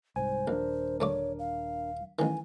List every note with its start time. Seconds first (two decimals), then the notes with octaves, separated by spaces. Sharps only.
0.16 C2 G#2 C5 G#5
0.48 D#1 A#1 D4 A#4
1.00 D2 A3 C#5 D6
1.39 F5
2.19 A1 D#3 G#5